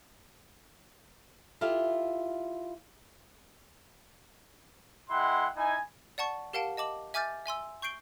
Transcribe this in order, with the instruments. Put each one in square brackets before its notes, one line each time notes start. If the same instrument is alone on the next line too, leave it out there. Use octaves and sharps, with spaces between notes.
[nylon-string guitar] E4 F4 G4 A4 E5 F5
[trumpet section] G#3 E4 F#5 G5 C6
D#4 E4 G#5
[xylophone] D5 F#5 A5 C#6
G4 A#4 F5 F#5 A5 D7
D#5 A5 D6 F#7
E5 G#5 D6 F6 G6 A6
E5 G#5 C6 E6
C#6 G6 C7 D7 G7